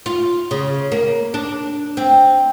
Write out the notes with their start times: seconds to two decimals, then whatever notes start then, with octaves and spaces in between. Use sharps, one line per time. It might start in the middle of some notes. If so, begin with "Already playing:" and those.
0.06 F4
0.51 C#3
0.92 A#3
1.34 D4
1.97 C4